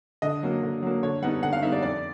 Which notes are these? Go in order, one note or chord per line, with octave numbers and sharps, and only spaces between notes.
D3 D#5
F#3 A#3
D3
F#3 A#3
D3 C#5
G3 B3 D#4 F#5
D3 F#5
F5
G3 B3 D#4 E5
D5
F2 D5